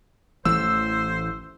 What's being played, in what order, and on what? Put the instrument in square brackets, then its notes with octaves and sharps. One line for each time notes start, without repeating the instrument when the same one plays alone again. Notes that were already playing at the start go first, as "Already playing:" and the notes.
[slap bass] A1 E3 A3 [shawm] C5 [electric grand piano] E6